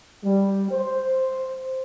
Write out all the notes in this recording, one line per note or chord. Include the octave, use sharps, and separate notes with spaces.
G3
C5